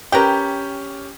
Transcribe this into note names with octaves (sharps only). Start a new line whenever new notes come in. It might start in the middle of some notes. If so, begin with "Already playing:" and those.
C#4 G4 A#4 B4 G5